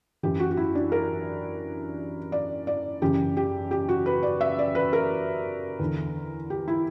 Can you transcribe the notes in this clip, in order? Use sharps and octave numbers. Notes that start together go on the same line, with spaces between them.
F#2 E3 G4
F#4
F#4
E4
D4
A#4
D5
D5
F#2 C#3 E3 G4
G4
G4
F#4
B4
D5
E5
D5
B4
A#4
E2 D3
G4
E4